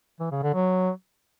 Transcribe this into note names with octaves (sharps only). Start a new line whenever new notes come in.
E3
C#3
D3
F#3